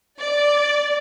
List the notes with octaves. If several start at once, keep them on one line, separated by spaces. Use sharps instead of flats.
D5